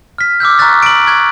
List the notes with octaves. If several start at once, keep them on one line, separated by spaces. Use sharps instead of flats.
F6 B6
D6 E6 F6 G6
A#5 C#6 D6 F#6 A6 B6
D7 F#7
C#6 F#6 G#6